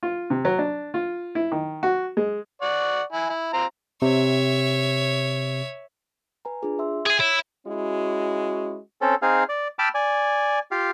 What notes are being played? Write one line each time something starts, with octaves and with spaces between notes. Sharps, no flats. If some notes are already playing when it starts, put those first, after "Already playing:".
F4
C3
F#3
D4
F4
E4
D#3
F#4
G#3
D5 F#5 C#6
E4 G#5
E4
C4 F4 A#5
C3 C#5 E5
B4 G#5 A#5
D4 F4 G#4
E5 C6 E6
G#4 G#5
E4 C#5
G#3 C#4 E4 F#4
C4 C#4 A4
C4 D#4 G#4 F5
D5
G5 A5 B5 D6 E6 F6
D5 G#5
F4 G4 F5